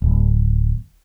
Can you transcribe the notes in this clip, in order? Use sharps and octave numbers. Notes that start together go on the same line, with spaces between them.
D1